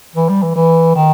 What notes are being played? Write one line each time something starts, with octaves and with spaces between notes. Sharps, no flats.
E3
G3
E3
E3
D#3